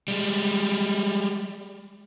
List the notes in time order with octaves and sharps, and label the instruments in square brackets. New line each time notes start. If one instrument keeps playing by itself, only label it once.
[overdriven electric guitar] G3 G#3